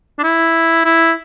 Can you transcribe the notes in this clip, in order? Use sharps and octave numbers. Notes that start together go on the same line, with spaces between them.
D4
E4
E4